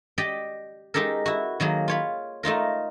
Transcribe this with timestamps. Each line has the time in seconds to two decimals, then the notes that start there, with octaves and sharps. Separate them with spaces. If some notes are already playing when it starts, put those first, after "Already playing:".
0.18 G4 D5 D#5 G5
0.94 G#3 D#4 G4 A4 A#4
1.26 E4 F#4
1.60 D#3 F#3 A#3 G#4
1.88 F4 C#5 B5
2.43 A3 D#4 F4 A#4